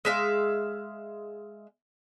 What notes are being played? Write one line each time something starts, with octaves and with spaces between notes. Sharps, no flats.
G#3 E5 F5